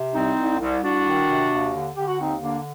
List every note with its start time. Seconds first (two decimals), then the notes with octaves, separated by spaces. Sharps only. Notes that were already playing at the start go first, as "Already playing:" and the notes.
Already playing: C3
0.14 C2 C4 D#4
0.36 C2
0.59 C2
0.82 C2 D4 F#4
1.05 D#3
1.27 C3
1.51 D#2
1.72 D3
1.95 D3 G4
2.07 F#4
2.18 D#2 C4 D#4
2.41 D3 A#3 D4